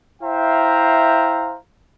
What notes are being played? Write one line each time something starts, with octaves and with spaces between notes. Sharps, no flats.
E4 C5 E5 F5 G5 A#5